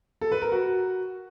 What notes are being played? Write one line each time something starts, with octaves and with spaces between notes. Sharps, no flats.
A4
B4
A#4
F#4